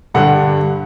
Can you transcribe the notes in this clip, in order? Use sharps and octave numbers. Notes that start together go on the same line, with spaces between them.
G2 D3 G3 F#5